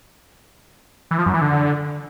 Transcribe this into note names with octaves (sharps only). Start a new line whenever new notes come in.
E3
F3
F#2
E3
D3